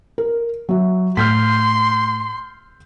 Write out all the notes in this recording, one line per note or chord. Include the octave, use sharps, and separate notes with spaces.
A#4
F#3 E5
A2 C6 F6 G6 B6